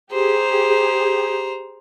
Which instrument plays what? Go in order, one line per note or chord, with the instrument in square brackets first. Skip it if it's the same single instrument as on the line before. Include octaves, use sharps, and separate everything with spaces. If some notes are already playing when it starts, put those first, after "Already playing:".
[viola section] G4 G#4 [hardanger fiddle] C5 A#5